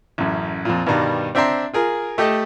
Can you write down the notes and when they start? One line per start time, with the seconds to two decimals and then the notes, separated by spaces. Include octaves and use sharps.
0.18 A1 F#2
0.65 F2 A#2
0.86 G2 B2 D#3 G3 A#5
1.35 C4 D4 E5 G5 A#5 C6
1.74 F4 G#4 A#4
2.18 A3 G4 A4 D#5